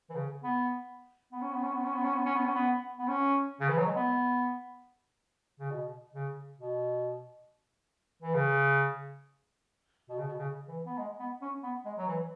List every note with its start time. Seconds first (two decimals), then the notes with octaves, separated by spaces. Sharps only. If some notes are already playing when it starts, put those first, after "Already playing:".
0.10 E3
0.15 C#3
0.44 B3
1.32 B3
1.42 C#4
1.52 B3
1.63 C#4
1.73 B3
1.84 C#4
1.94 B3
2.04 C#4
2.14 B3
2.25 C#4
2.35 B3
2.46 C#4
2.55 B3
2.99 B3
3.08 C#4
3.60 C#3
3.69 E3
3.78 F#3
3.87 G#3
3.96 B3
5.59 C#3
5.71 B2
6.14 C#3
6.59 B2
8.22 E3
8.34 C#3
10.09 B2
10.18 C#3
10.28 B2
10.39 C#3
10.68 E3
10.86 B3
10.98 G#3
11.19 B3
11.42 C#4
11.63 B3
11.85 G#3
11.98 F#3
12.08 E3